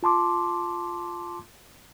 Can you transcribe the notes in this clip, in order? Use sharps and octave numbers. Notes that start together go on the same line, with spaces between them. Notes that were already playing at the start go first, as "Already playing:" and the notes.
F4 A5 C6 D6